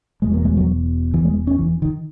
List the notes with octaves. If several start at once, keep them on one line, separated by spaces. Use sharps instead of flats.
E1 E2 B2 G#3
A#3
G#3
F#3
E3
G#3
C#4
E3
D#3